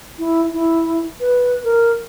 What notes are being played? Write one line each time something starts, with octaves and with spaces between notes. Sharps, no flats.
E4
E4
B4
A#4